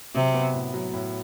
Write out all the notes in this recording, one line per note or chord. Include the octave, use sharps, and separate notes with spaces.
C3 F#3
B3
A2
F#3
A2